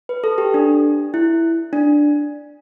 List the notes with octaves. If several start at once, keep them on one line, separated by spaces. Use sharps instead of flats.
B4
A4
G4
D4
E4
D4